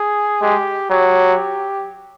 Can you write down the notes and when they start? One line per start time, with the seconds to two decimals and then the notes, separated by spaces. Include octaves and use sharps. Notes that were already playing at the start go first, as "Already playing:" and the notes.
Already playing: G#4
0.42 G#3 G4
0.90 F#3 G4